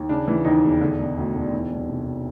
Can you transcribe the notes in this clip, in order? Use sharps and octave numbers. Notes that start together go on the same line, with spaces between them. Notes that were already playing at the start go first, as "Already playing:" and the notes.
Already playing: D#2
C#3 D4
E3
D#2 D#4
E1
D3
E1
D2
E1
E3
C2
C3